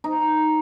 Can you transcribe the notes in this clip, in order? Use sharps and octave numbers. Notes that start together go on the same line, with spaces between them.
D#4